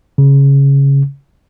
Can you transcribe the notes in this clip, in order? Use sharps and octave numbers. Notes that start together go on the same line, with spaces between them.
C#3